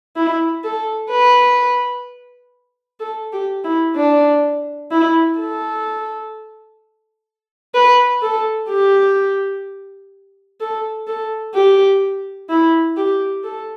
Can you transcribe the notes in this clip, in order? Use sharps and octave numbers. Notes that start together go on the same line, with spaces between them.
E4
A4
B4
A4
G4
E4
D4
E4
A4
B4
A4
G4
A4
A4
G4
E4
G4
A4